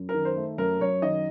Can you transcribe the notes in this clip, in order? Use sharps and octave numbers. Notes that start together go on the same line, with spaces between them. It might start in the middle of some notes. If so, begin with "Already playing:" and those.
Already playing: F#2
A#4
D#3
C5
A3
F#2 A#4
F#2 C#5
D#3 D#5